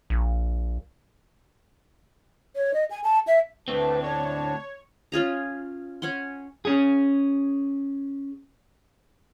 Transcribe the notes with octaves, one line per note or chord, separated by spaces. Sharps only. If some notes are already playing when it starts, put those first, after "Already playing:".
A#1
C#5
D#5
G#5
A5
E5
D2 A2 A3 C4 D4 B4
C#5 D5
C#4 F4 G#4 A#5
C#4 C#5 F#5 C6
C#4 G#4